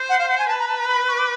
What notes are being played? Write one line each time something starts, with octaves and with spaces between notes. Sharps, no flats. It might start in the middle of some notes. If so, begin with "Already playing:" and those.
Already playing: C5
F#5
F5
F#5
G#5
B4 A5
A#5
A5
A#5
B5
C#6
D6